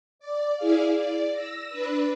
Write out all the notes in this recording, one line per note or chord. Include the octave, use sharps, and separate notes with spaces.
D5
E4 G#4 D5 F5
D5
E6 A#6
D4 B4